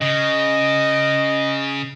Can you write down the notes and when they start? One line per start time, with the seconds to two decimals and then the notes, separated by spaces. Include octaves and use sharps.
0.01 C#3 D#5